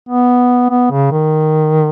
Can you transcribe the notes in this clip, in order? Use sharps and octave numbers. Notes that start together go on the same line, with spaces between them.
B3
B3
C#3
D#3